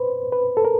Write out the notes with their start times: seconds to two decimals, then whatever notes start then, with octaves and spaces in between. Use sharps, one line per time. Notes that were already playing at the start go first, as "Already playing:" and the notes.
Already playing: B4 C5
0.32 B4
0.57 A4
0.65 A#4